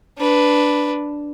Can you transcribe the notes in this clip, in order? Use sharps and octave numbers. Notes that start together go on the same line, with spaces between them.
D4 B4